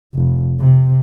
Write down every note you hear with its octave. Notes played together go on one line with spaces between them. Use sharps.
F1
C3